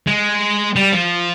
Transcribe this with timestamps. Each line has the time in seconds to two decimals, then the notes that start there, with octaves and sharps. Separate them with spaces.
0.07 G#3
0.76 G3
0.92 F3